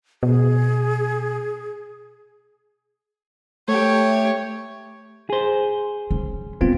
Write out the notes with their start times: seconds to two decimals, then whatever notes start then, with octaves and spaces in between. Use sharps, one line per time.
0.23 B2 G#4
3.68 A3 G4 C#5
5.30 G#4 C5
6.11 C#4
6.61 G2 B3 C4 F4